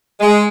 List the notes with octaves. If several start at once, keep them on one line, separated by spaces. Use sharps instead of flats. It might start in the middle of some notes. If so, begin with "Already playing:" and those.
G#3